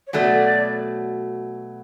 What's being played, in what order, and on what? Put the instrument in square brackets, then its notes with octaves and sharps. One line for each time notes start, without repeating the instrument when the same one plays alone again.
[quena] C#5
[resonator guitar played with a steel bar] B2 F#3 A3 [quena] D5